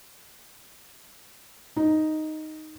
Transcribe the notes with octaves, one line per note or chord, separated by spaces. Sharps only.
D#4